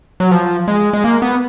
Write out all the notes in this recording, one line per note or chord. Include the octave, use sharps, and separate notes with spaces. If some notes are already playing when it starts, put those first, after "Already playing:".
F#3
F3
G#3
G#3
A#3
B3